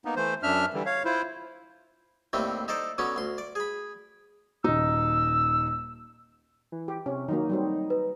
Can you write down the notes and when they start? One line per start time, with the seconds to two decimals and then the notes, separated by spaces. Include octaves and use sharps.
0.05 A#3 B3 D#4
0.16 E3 A3 C5
0.43 F#2 D4 E5 F6
0.74 D3 E3 G3
0.86 C#5 F5
1.05 E4 F4 C5
2.33 D#2 A2 G3 A3 C4
2.68 D#4 A4 C5 D5
2.98 D3 F#3 B3 C#4
3.16 D2 C6
3.38 D5
3.55 G#4 B5
4.64 D#1 D#4 E6
6.72 E3
6.88 G4
7.06 C3 C#4
7.28 D#3 F#3 A#3 D#4
7.49 F#3 G3 C4
7.90 B4